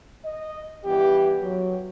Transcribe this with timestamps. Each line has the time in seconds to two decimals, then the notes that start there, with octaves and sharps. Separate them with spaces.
0.25 D#5
0.85 G2 E3 B3 G4
1.41 F#3